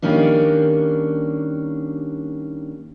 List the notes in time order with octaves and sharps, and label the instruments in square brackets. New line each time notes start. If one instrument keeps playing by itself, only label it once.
[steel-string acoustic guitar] D#3 G3 A#3 C#4 D4